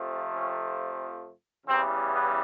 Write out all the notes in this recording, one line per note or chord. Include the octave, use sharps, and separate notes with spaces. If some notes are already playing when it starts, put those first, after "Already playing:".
Already playing: F2 C3 F3 A3
C#4
E2 C#3 E3 G3 C4
B3